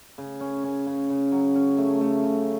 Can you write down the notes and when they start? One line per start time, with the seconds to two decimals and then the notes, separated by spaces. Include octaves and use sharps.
0.18 C#3
0.40 C#4
0.64 C#4
0.87 C#3
1.10 C#3
1.32 F#3
1.56 C#4
1.78 A3
2.01 A3
2.24 C#3